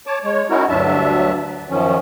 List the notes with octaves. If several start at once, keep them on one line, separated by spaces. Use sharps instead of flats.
C#5 A5 D6
G#3 C#5
C#4 D#4 E4 F#4 A#4
D2 G2 F#3 D4 E5 A5
F#2 D#3 F3 C#4